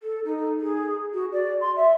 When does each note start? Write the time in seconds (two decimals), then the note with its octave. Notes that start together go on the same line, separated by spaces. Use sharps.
0.01 A4
0.24 D#4
0.60 G#4
1.13 F#4
1.32 D5
1.61 C6
1.76 E5